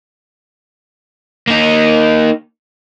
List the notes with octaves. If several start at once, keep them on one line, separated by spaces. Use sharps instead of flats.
A#3 D#4